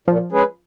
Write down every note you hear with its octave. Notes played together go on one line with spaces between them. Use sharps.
A#2 F3
G#3 C#4 G#4 B4